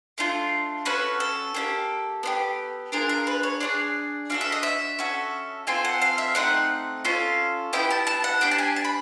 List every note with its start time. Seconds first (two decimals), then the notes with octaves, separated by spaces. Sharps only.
0.18 A3 D4 F4
0.85 C#4 F#4 A4 B4
1.20 A4
1.54 A#3 D4 G4
2.23 B3 D4 G4
2.92 D4 F4 G#4 A#4
3.09 A#4
3.27 B4
3.43 C#5
3.60 D4 F4 G#4 D5
4.30 D4 F#4 A4 F5
4.41 E5
4.52 D#5
4.63 E5
4.99 C#4 F#4 A4
5.67 C4 F4 A4 G#5
5.85 F#5
6.02 F5
6.18 E5
6.35 A3 C4 D#4 F#5
7.05 C#4 F4 A4
7.73 B3 E4 G4 G5
7.90 A5
8.07 A5
8.24 F#5
8.41 D4 G4 G5
8.51 A5
8.58 G#5
8.76 A5
8.85 B5